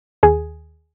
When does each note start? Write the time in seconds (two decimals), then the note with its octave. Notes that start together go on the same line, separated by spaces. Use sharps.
0.23 D#2 G#4